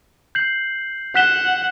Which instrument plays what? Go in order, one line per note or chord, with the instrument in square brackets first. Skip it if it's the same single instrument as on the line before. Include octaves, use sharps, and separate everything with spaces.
[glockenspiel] G6 C7 F#7
[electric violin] F#5 [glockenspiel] F#6 B6 E7 G7